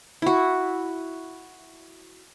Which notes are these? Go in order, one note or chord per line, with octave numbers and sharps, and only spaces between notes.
E4 F#4